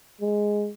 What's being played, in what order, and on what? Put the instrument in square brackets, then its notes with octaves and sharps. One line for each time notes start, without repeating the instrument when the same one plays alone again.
[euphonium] G#3